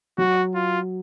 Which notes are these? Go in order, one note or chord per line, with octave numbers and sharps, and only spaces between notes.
F#3 F#4
F4